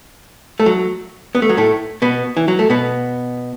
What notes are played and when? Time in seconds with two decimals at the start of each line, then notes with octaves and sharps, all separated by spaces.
0.60 A3
0.66 F#3
1.35 B3
1.42 A3
1.49 F#3
1.57 A2 A3
2.02 B2 B3
2.37 E3
2.48 F#3
2.59 A3
2.70 B2 B3